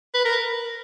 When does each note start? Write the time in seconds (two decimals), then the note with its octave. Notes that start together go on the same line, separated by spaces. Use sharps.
0.14 B4
0.25 A#4